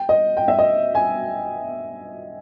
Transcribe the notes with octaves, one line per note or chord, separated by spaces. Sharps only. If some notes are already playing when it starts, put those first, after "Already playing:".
Already playing: G5
D#5
G5
E5
D#5
G#5